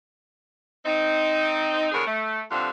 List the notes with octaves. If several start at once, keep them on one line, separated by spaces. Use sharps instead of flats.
C4 D#4
E2 D3 C4 G#4 A#4 C#5
A3
F2 D3 E3 G3 C4 F4